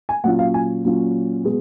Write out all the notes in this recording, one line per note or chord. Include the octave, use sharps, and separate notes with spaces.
G#5
A#2 F#3 C#4 F4 F#5
F5
G#5
A#2 F#3 C#4 F4
B2 G#3